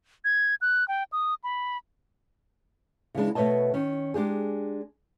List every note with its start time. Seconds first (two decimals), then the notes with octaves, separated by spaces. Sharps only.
0.25 G#6
0.61 F#6
0.88 G5
1.12 D#6
1.44 B5
3.15 C#3 E3 G#3 D4
3.35 B2 A3 B4 C#5 D#5 A5
3.74 D#3 C#4
4.14 G#3 D4 G4 G#4